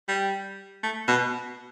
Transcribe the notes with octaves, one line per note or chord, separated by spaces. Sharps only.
G3
A3
B2